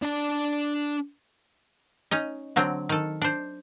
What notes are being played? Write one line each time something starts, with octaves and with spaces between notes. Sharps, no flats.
D4 A5
C#4 D#4 D#5
D3 F#3 C4
D#3 A4
D4 C5